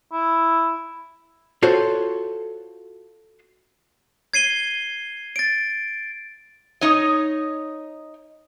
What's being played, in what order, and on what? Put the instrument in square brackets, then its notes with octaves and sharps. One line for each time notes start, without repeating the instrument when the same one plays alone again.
[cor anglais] E4
[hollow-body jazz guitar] F4 F#4 A4 C5 C#5
[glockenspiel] G#6 C7 D#7 G7
A6 D7
[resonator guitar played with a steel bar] D#4 C#5 D#5